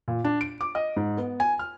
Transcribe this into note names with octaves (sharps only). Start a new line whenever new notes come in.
A#2
D4
D7
D6
D#5
G#2
B3
G#5
F6